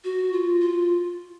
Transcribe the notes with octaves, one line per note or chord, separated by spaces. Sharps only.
F#4
F4
F4